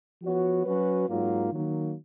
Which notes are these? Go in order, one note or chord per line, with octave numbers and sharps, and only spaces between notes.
F3 B3 F#4 C#5
F#3 C#4 F#4 B4
G#2 F#3 A#3 F4
D#3 F#3 A#3